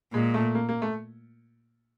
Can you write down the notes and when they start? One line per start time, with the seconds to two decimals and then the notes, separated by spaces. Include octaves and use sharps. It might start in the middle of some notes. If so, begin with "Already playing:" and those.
0.13 A#2 G#3
0.34 A3
0.55 A#3
0.69 A#3
0.82 A3